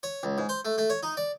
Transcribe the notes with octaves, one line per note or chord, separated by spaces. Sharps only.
C#5
C#2
G#2
C5
A3
A3
C#5
D#4
D5